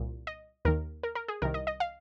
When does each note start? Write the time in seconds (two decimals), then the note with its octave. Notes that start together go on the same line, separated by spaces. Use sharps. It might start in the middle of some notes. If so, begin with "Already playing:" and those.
Already playing: C2 A#2
0.27 D#5
0.65 D#2 D#3 A#4
1.03 A#4
1.15 A#4
1.28 G#4
1.42 C2 C3 D#3 A#4
1.54 D#5
1.67 D#5
1.80 F5